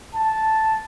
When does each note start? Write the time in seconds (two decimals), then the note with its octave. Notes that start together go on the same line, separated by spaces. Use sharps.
0.14 A5